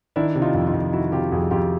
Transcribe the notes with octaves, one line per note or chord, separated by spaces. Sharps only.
D#3 D4 E4
C3
D#4 F4
F2
D#4 F4
F2
D#3 E4 F#4
C3 F4 G4
F2 F#4 G#4
F2 F4 G4